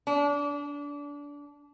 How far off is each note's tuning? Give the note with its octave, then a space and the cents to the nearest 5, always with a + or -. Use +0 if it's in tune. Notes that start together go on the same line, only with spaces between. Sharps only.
D4 -25